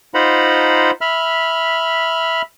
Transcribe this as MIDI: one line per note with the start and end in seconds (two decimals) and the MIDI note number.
0.14 0.91 63
0.14 0.91 65
0.14 0.91 72
0.14 0.91 78
0.14 0.91 82
0.14 0.91 83
1.01 2.42 76
1.01 2.42 83
1.01 2.42 89